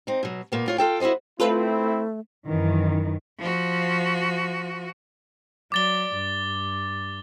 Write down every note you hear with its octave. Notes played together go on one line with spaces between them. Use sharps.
C4 D#4
B2 F#3
A#2 A#3 B3
A2 F4 C#5
F4 A4 G5
E4 F#4 G4 C5 D#5
A3 C4 E4 F4 A4 B4
F#2 D#3 E3
F3 F#4
F#3 D5 D6 A6 G7
G2